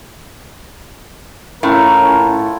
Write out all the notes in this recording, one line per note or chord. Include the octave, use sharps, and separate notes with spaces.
A2 C#4 E4 F4 A#4